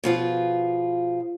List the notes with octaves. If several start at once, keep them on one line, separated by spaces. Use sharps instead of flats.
B2 F3 F4 G#4